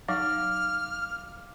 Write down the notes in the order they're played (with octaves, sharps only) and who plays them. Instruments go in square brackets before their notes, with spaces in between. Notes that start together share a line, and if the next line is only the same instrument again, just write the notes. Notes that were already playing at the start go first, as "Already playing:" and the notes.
[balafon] F#3 D#4 F#5 [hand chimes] F5 D6 [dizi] F6